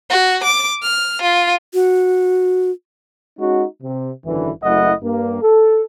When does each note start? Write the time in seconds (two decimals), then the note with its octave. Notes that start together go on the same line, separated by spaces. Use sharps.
0.10 F#4
0.44 D6
0.82 F6
1.22 F4
1.74 F#4
3.39 G#3 C#4 D#4 F#4
3.82 C3
4.25 G#1 F#2 D3 E3
4.63 F#1 F#3 A3 E4 D#5 F#5
5.03 G2 A#3
5.42 A4